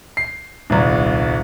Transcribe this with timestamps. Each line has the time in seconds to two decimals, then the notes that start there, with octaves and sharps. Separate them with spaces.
0.17 C7
0.70 D#1 C2